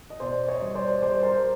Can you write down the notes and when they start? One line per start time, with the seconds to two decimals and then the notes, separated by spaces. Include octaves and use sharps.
0.10 D#5
0.20 B2 C5 D5
0.48 C#5 D#5
0.62 G3
0.75 C5 D5
1.02 G3 C5 D5
1.23 A#4 C5